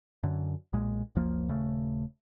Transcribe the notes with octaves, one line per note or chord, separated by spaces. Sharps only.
F#2 D3
B1 A#2 G#3
F#1 C#2 F3 A#3
D#1 C#3 A3